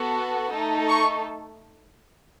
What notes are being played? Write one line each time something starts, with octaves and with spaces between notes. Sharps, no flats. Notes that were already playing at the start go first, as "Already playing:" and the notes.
Already playing: B3 F#4 A4
A3 D#4 A4
C#6